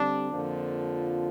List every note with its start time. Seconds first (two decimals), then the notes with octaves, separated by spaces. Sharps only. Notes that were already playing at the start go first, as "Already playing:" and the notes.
Already playing: D3 G3 C4 D4
0.31 F2 D3 F3 A#3 F4